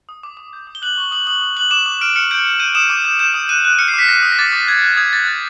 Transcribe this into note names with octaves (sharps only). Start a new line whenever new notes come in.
D#6
D6
D6
G6
D#6
G7
F#6 F#7
C#6
D#6 F#7
D#6 F#7
D#6
F#6 F#7
D6 E7
D6
F6 D7
F6 C#7
G6 D7
G6
G6 D#7
D#6 E7
D6
G6
G6 E7
D#6
F#6 D#7
F#6
F6 C#7
C7
D6
B6
D#6 A#6
D#6
A#6
D6 A6
D6
F#6 G#6
F#6
D#6 G#6
G6 A6
F#6 A6